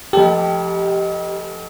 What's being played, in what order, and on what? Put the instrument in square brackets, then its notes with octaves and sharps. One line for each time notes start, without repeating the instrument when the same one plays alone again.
[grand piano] F1 A4 [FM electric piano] G4